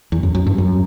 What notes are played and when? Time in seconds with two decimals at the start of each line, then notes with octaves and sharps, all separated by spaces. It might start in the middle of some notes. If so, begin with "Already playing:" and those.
0.12 E2
0.23 F#2
0.35 F#2
0.47 G2
0.58 F#2